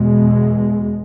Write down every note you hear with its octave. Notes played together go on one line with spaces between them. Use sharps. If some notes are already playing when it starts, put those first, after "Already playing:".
Already playing: E2 B2 G#3